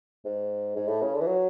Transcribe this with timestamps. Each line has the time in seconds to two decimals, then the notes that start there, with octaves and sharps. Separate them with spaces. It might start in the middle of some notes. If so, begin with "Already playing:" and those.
0.25 G#2
0.76 G#2
0.88 A2
1.02 C#3
1.14 D3
1.21 E3
1.27 F#3